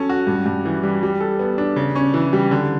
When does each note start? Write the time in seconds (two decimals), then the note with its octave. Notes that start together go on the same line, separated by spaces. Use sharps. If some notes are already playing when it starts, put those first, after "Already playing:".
Already playing: F#3 C#4 A4
0.09 F#4
0.27 G2
0.46 G2
0.65 E3
0.83 G3
1.03 G3
1.20 A4
1.39 B3
1.58 D4
1.76 C#3
1.95 C#4
2.14 E3
2.33 G3
2.51 D3